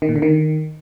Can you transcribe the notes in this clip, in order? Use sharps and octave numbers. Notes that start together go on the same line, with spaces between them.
D#3
A#2
D3
D#3